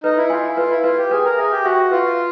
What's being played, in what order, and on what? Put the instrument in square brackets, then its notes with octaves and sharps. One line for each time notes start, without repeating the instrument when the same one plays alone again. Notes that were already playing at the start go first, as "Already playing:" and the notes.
[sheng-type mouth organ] D#4 [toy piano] B4
[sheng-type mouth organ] E4
[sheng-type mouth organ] F4 [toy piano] G#5
[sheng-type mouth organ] E4
[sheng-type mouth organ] F4 [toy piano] B4
[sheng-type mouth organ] E4
[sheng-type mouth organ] F4 [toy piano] B4
[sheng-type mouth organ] G4
[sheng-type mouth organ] G#4 [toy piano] B4
[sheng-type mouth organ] A#4
[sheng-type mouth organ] G#4 [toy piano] E5
[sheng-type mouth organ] G4
[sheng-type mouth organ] F#4 [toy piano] E5
[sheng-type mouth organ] F4 [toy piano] B4